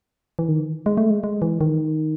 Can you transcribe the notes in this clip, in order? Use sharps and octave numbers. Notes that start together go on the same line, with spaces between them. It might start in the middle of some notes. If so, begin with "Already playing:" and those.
E3
D#3
G#3
A3
G#3
G#3
E3
D#3